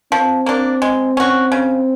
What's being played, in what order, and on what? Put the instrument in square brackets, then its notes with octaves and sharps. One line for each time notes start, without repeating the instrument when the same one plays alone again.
[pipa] F3 [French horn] C4
[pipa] A#3 D4
G#3
C#4 F#4
C#3